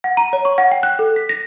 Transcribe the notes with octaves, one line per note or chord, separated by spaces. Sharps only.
F#5
A#5
C#5
C#6
F#5
G5
F#6
A4
B6
A#6